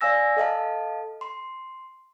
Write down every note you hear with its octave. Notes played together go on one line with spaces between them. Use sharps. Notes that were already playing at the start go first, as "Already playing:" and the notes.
D5 F5 G#5 E6 A#6
A4 D#5 F5 A5
C6